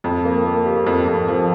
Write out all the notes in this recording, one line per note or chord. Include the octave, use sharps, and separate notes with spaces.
F2
A#3
A#3
G4
F2
F2
F3